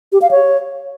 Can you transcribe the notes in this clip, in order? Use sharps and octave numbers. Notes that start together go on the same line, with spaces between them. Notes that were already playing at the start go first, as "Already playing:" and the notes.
G4
F5
C#5